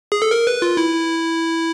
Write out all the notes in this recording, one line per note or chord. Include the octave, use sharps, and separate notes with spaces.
G#4
A4
A#4
B4
F4
E4